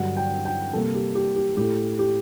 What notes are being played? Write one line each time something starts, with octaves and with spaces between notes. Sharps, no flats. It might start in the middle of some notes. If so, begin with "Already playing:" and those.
Already playing: G2 D3 F#3 F#5
G5
G5
C3 G3 A#3 A4
G4
G4
G4
A2 A3 G4
G4